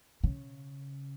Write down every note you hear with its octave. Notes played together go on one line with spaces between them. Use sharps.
C#3